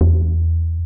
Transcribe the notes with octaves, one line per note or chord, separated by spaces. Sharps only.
E2